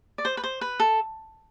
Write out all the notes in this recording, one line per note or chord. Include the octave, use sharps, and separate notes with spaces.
D5
C5
B4
C5
B4
A4